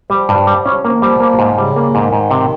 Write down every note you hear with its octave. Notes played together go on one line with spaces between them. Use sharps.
F3 G3
G2
G3
C#4
F3 A#3
D#3
F3 G3
A#3
G#2
C#3 G3
A#3
G#2 D#3
G#2
C3